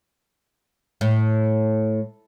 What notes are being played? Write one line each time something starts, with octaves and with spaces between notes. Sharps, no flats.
A2